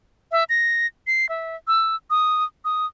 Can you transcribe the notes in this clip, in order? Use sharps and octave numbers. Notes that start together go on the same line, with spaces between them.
E5
A#6
C7
E5
E6
D#6
D#6